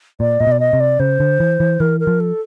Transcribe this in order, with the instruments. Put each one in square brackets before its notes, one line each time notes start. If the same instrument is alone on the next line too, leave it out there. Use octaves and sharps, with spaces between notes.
[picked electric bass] A#2 [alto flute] D5
[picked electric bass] A#2 [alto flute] D#5
[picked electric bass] B2 [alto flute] D5
[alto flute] D#5
[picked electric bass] C3
[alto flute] D5
[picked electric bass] C#3 [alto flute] C5
[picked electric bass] D3
E3
E3
[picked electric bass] E3 [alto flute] A#4
[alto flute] A#4
[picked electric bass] F3
[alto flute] A4